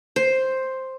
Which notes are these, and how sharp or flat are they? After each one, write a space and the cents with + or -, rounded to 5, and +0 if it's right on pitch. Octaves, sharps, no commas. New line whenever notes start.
C5 +5